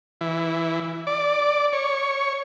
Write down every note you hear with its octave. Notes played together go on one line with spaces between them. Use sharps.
E3
D5
C#5